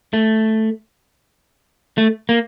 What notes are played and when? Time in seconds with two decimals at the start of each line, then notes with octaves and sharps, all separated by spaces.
0.13 A3
1.98 A3
2.29 A#3